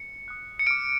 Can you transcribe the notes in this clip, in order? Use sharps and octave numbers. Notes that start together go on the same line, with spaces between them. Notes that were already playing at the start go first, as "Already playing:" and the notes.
Already playing: C#7
D#6 F#6
C#7
D6 F6 D7